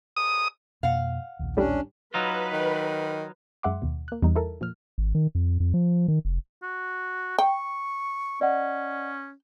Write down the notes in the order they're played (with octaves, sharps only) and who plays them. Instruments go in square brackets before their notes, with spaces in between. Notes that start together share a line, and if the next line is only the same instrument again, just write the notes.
[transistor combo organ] D#6
[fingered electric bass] F2 B2 A#3 [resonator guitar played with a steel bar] F5 F#5
[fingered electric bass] A#1 D#2
[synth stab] A2 G3 [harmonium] C#4 D4
[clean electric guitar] F#3 D#4 F4 [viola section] B4
[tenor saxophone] D#3
[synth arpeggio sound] F#2 G#3 E5 F#5 C6 D6
D#2 B2
A#3 F#6
E2 G3 D#4
E4 A4 A#4
A#2 F3 F6
[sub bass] G#1
D#3
F2
F2
F3
D#3
F1
[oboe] F#4
[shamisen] G5 [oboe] C#6
[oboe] C#4 [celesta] D5 D#5 F#5